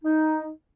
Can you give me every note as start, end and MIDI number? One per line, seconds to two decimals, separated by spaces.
0.04 0.49 63